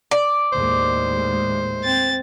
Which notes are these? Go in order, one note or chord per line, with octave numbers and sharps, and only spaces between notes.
D5
D#2 A2 G#3 C5
C4 A6